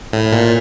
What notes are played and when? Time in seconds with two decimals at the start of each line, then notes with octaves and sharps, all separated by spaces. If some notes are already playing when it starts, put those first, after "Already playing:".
0.13 A2
0.32 A#2